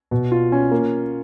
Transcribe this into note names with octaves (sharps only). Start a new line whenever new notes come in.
B2
F4
C#4
A#3